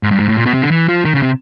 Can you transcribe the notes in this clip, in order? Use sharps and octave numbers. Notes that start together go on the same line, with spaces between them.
G#2
G2
G#2
A2
A#2
B2
C3
D3
E3
F3
D#3
C#3
C3